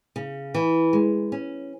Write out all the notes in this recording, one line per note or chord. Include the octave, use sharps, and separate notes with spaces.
C#3
E3
G#3
C#4